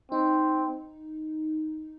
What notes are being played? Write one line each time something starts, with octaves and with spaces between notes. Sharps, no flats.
C4 D#4